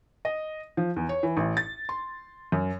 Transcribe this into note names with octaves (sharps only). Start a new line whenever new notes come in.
D#5
F3
E2
C#5
E3
A1
A6
C6
F#2